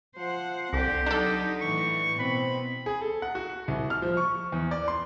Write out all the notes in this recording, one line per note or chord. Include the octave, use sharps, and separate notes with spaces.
F3 C5 F#5
C2 D3 C4 G4
F#3 D4 D#4 A4
A2 E3 C#6
B2 C4 B5
G#4
A4
F#5
F#4
C2
F6
F3
C#6
E2
D5
C6